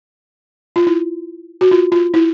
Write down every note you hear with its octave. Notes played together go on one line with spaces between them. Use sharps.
F4
E4
F#4
F4
F4
E4